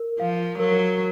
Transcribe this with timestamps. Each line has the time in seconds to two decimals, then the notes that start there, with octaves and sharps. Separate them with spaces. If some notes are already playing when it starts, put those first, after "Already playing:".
Already playing: A#4
0.20 F3 F5
0.59 F#3 A#4